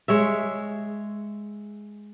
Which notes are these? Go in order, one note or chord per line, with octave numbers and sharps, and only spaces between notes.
G#3 C#5 E5